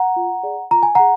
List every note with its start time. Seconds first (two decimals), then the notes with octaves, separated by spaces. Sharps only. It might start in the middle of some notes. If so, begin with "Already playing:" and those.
Already playing: F#5 A#5
0.16 F4
0.43 G#4 D5
0.71 F4 A#5
0.83 G#5
0.95 G#4 F#5 A#5